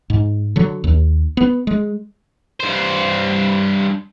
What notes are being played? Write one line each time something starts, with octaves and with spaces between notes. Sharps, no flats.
G#2
D3 F#3
D#2
B3
G#3
G2 C5